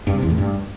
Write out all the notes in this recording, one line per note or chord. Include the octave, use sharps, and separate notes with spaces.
G2
C3
E2
A2
G2